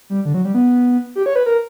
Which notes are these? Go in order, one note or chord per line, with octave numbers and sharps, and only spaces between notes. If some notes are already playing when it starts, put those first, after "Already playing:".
G3
D3
F#3
G3
B3
G4
C#5
B4
A#4